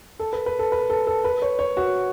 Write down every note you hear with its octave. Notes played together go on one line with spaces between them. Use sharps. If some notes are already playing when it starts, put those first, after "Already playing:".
A4
B4
B4
A4
B4
A4
A4
B4
C#5
C#5
F#4